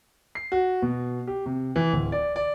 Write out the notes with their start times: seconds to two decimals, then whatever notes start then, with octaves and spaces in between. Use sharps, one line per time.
0.35 C7
0.52 F#4
0.82 B2
1.27 G4
1.46 C3
1.76 E3
1.93 D1
2.12 D5
2.36 D5